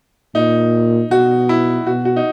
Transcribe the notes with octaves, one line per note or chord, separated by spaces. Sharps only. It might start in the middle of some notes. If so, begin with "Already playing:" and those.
A#2 D#4
B2 F#4
E4
B2 F#4
F#4
D#4